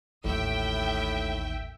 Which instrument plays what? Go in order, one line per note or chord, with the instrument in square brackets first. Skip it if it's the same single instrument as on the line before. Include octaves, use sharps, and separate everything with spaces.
[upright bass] A1 [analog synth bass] D#2 [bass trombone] A2 [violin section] E5 G5